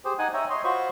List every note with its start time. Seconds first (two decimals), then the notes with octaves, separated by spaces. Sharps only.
0.05 G4 G#4 C5
0.19 D#4 F#5 G#5
0.34 C#5 E5 G5 A#5
0.50 C#5 D#5 C6
0.64 F4 F#4 C5 B5 C#6